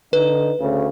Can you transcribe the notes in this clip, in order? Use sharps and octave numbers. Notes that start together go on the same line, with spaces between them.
D3 D#4 B4
D2 C#3